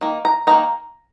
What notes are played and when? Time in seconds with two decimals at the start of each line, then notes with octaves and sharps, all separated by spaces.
0.01 D#3 A#3
0.25 A#5
0.47 D#3 A#3 D#4 A#5